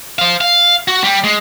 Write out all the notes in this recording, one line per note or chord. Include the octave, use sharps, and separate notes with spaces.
C5 F5
F5
F#4
G3
G#3